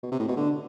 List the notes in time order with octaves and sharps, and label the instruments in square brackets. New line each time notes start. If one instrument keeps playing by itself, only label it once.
[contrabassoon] B2
C3
A2
B2
D3